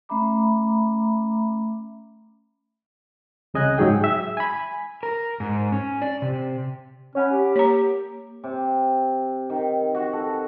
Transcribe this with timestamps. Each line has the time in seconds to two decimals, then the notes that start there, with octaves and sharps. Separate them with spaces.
0.09 A3 C#4 E5 A#5 B5 D6
3.54 C2 C#3 D#5 G#5 F#6
3.78 G#2 F#3 D#4 G#4 G5
4.04 E5
4.37 G#5 B5
5.03 A#4
5.40 G#2
5.72 C#4
6.02 D5
6.22 C3
7.15 C#4 C#5 F#5 B5
7.32 G4
7.56 A#3 C#5 A#5
8.44 C3
9.50 D#3
9.94 F#4
10.13 A4